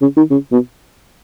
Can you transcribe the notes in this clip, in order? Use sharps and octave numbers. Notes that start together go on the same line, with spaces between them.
C#3
D#3
C#3
B2